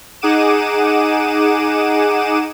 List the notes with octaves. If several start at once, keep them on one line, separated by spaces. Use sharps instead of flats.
D#4 G#4 F#5 D6 D#7 E7